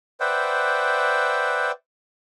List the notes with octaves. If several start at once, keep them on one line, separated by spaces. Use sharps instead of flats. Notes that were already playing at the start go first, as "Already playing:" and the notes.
B4 C5 D5 E5 F#5 G5